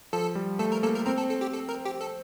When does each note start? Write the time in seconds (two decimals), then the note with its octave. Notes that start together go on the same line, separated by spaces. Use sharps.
0.13 F3 A4
0.35 G3
0.59 A3 A4
0.72 A#4
0.83 A#3 A4
0.95 A#4
1.06 C4 A#4
1.18 A4
1.29 A4
1.41 G4
1.53 A4
1.69 A#4
1.85 G4
2.01 A4